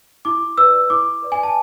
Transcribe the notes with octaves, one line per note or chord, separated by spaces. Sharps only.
E4 D6
B4 D5 E6
E4 D6
B4 D5
G#5
A5